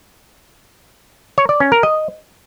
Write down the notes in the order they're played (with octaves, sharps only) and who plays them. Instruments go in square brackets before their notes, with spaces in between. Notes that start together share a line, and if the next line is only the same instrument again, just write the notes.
[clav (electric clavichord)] C#5
D5
C#4
A#4
D#5